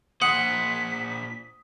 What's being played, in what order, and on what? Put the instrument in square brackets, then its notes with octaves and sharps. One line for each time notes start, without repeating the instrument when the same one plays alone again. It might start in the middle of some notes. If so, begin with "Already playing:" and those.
[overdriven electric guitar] A#2 C5 [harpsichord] F#5 [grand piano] D#6 [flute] B6